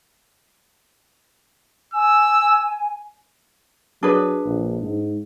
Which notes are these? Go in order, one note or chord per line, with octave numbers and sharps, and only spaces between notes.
G#5 E6
F#3 D4 G#4 B4
A#1
G#2